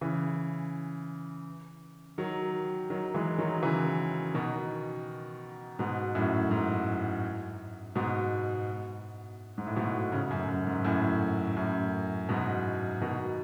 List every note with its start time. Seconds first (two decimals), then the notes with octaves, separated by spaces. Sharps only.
0.01 C#3 E3
2.18 D#3 F#3
2.90 D#3 F#3
3.14 E3 G#3
3.38 D#3 F#3
3.62 C#3 E3
4.34 B2 D#3
5.79 G#2 B2
6.15 F#2 A2
6.51 G#2
7.95 G#2 B2
9.58 G#2
9.67 A2
9.76 G#2 B2
10.12 A2 C#3
10.31 F#2
10.48 F#2
10.67 G#2
10.84 F#2 A2
11.57 F#2 A2
12.29 G#2 B2
13.01 B2 D#3